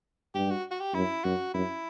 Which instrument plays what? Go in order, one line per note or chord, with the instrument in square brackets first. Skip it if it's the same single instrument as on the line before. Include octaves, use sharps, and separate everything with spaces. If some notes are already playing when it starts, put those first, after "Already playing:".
[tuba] G2 [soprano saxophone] G4
[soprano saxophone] F#4
F#4
G4
[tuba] F#2 [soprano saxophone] E4
[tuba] F#2 [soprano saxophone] F#4
[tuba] F#2 [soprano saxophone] E4